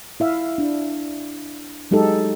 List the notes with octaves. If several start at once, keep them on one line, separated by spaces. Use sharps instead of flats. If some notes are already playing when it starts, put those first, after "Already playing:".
E4 E5 F5
D4
F#3 G#3 D#4 G4 A4